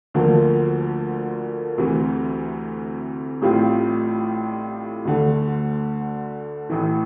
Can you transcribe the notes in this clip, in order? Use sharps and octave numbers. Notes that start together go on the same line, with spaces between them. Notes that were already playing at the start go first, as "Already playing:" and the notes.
D2 D3 F3 A#3
D2 C3 E3
A1 A2 G3 C4 F4
D2 D3 A3
A1 A2 E3